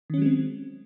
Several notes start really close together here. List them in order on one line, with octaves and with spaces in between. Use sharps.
D#3 C#4 F#3 G#3 C4